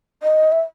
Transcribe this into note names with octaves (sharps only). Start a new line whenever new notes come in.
D#5
E5